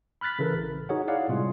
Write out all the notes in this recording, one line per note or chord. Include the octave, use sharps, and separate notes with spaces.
B5 F6 F#6 A6 B6
C#3 E3 A4 A#4
A1
D#4 F#4 G#4 C#5 F#5
E4 G#4 C#5 D5 F5 F#5
A2 C3 G3 G#3 F4 G#4